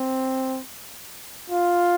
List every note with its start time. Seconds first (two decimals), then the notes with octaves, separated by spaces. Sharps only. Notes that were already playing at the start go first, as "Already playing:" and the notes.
Already playing: C4
1.50 F4